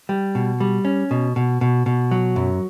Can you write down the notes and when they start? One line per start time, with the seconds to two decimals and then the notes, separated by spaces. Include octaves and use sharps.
0.09 G3
0.35 B2
0.60 G3
0.85 C#4
1.11 B2
1.36 B2
1.61 B2
1.86 B2
2.11 F#3
2.36 F#2